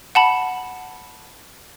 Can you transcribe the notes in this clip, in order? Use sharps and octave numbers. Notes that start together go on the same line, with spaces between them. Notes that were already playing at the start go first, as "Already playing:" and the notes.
F#5 A5 B5